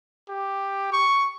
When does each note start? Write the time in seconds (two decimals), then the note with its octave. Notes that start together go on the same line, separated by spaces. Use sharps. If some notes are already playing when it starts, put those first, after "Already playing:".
0.29 G4
0.92 C#6